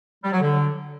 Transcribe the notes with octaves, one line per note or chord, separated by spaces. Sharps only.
G3
F#3
D3